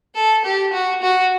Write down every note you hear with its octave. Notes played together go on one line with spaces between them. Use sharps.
A4
G4
F#4
F#4